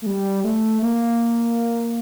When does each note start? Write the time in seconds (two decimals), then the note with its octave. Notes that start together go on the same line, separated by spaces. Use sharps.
0.02 A3
0.06 G3
0.44 A3
0.82 A#3